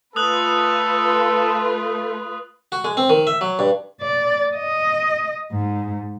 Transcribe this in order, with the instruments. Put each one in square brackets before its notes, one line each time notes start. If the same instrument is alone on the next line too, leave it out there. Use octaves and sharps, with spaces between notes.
[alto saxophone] A3 [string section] F4 B4 [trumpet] A4 [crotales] D#6 F#6 F#7
[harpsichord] F#4
G#3
C4
D#3
E5
F#3
G2
[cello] D5
D#5
G#2